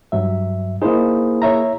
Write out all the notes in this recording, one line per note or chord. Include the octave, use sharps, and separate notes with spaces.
G2 F#3 E5
A#3 D#4 E4 G#4 C5
C#5 E5 A#5